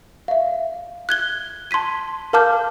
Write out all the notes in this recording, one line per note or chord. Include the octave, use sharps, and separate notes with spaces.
E5 F5
F#6 G#6 G7
A5 C6 G#6 B6 D#7
A#4 F5 A5 D6 F6 G6